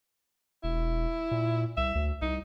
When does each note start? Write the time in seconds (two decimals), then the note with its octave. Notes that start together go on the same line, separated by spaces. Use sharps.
0.64 E1 E4
1.31 A#2
1.77 C2 E5
1.95 D2
2.22 C2 D#4